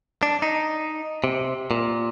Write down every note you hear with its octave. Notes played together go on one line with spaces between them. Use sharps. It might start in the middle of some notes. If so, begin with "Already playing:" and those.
D4
D#4
C3
A#2